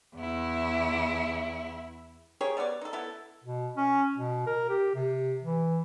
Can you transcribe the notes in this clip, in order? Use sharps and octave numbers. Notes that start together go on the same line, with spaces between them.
E2 E4
G4 G#4 A#4 C#5
G3 B3 C#5 D5
D#4 A4
B3 E4 A4
B2
C#4
B2
A#4
G4
C3
E3